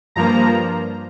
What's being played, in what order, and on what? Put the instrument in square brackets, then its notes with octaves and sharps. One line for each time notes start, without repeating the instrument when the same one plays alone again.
[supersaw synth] G2 F3 A#3 A#5